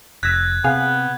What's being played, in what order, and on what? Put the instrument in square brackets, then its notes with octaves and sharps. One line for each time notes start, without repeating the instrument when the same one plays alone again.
[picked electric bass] F1 [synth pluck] E6 A#6 B6 [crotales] F#6 G#6
[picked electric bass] C3 [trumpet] B3 [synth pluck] G#4 F5 G#5